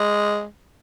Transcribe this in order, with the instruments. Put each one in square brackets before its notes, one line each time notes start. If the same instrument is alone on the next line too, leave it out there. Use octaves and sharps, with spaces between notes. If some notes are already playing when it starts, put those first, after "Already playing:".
Already playing: [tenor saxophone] G#3